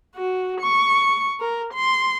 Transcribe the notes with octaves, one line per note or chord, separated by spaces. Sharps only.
F#4
C#6
A#4
C6